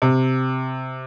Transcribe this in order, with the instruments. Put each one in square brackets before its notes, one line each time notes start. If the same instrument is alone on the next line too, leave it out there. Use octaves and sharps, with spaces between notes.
[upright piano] C3